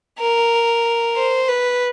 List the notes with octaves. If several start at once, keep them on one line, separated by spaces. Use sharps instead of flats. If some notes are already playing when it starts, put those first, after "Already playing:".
A#4
C5
B4